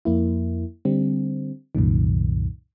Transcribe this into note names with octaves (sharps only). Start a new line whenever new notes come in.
F2 A#3 E4
D3 G3 C4
C2 F#2 A#2 D#3